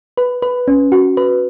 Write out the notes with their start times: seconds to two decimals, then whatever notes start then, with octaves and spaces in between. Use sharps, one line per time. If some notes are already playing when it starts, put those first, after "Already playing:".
0.17 B4
0.42 B4
0.68 C#4
0.92 F#4
1.17 B4